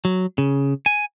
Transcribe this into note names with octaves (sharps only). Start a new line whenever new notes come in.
F#3
C#3
G#5